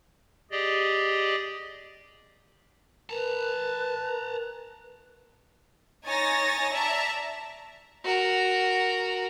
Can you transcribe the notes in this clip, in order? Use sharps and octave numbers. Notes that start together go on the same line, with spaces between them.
G4 G#4 D5 D#5
A#4 B4 A5 A#5
D#4 C#5 G#5 A6 A#6
D5 E5 A5 A#5
F#4 A#4